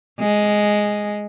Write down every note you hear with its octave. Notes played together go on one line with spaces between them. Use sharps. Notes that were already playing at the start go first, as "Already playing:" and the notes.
G#3